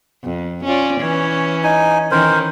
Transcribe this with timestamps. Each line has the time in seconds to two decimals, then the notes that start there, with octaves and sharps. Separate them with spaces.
0.23 F2
0.65 C#4 F4 D5
1.01 E3 C#4 C#5
1.63 D#4 G#5
2.11 D#3 E3 C#4 A#4 C5